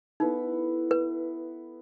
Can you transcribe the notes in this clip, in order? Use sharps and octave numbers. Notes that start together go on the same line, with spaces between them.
B3 D#4 E4 A4
B4